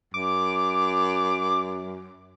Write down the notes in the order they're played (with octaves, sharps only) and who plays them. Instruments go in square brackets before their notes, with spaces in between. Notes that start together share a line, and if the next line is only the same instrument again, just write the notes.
[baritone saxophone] F#2 [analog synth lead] D6